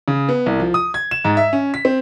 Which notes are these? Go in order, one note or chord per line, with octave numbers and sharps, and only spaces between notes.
C#3
B3
C2
F3
D#6
G#6
E7
G#2
E5
C#4
B6
C4